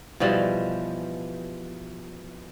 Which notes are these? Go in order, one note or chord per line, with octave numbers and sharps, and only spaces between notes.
B2 E3 F3 G3